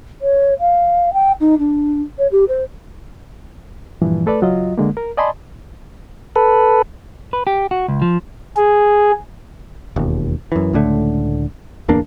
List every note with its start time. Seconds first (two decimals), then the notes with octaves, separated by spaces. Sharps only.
0.21 C#5
0.59 F5
1.13 G5
1.40 D#4
1.58 D4
2.18 C#5
2.31 G4
2.48 C5
4.02 G2 A#2 E3 F3
4.26 A3 A4 B4 D5
4.41 C#2 F#3 F4 D#5
4.78 D3 G#3 A#3
4.97 A#4
5.17 D5 D#5 G#5 A5 B5 C6
6.36 A4 B4
7.33 B4
7.47 G4
7.71 F#4
7.88 C#2
8.02 F3
8.56 G#4
9.96 E1 D#2
10.52 F#2 E3
10.73 C#2 A2 D3 A3
11.88 D1 E2 A#3 D4